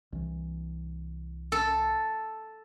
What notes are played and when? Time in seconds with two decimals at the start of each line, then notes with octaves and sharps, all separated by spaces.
0.12 C2 E3
1.52 A4